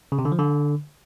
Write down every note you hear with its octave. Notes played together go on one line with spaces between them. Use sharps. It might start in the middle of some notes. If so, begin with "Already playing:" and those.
C#3
C3
D3
F3
D3